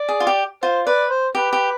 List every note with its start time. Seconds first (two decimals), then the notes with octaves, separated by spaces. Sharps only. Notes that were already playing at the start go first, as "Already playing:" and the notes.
Already playing: D5
0.09 G#4
0.20 F4
0.27 G4
0.63 F4 C5
0.86 B4 D5
1.10 C5
1.35 G4 B4
1.53 G4